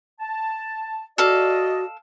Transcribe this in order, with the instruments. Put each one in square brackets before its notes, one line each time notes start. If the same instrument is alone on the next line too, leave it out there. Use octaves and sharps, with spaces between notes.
[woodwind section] A5
[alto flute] F#4 [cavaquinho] A4 F5 [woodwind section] D5 D#5